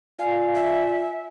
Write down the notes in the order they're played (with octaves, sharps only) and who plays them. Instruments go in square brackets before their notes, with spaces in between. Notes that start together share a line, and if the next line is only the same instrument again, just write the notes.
[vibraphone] F4 D5 G#5 [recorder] F5
[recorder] E5